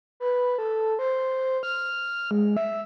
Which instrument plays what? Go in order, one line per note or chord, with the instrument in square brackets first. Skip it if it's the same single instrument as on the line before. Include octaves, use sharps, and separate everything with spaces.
[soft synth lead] B4
A4
C5
F6
G#3
E5